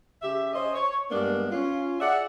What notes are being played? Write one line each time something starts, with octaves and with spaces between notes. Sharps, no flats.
C#3 G4 E5
C#4 C5 D#5
C#5
G2 G#3 A#3 B3 D4
C#4 F4
G#4 D5 E5 F#5